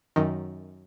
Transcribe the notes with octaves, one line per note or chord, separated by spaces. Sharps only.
F#2 D#3